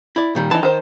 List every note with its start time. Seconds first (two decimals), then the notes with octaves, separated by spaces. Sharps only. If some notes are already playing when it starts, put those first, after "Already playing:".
0.16 E4 D5
0.35 A#2 D#3 G3
0.51 E3 D#4 A5
0.63 D#3 C5